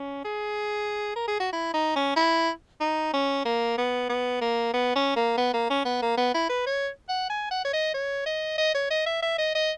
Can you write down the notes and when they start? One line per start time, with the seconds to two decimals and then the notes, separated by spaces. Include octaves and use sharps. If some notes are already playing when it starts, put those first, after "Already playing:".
Already playing: C#4
0.25 G#4
1.16 A#4
1.28 G#4
1.40 F#4
1.53 E4
1.74 D#4
1.96 C#4
2.16 E4
2.81 D#4
3.14 C#4
3.45 A#3
3.78 B3
4.10 B3
4.41 A#3
4.74 B3
4.96 C#4
5.16 A#3
5.38 B3
5.54 A#3
5.70 C#4
5.85 B3
6.02 A#3
6.18 B3
6.35 E4
6.49 B4
6.66 C#5
7.09 F#5
7.30 G#5
7.51 F#5
7.65 C#5
7.73 D#5
7.94 C#5
8.26 D#5
8.58 D#5
8.74 C#5
8.91 D#5
9.06 E5
9.22 E5
9.38 D#5
9.55 D#5